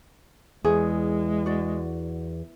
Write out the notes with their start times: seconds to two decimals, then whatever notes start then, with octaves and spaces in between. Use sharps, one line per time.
0.65 E2 G#3 G#4
1.46 F#4 D5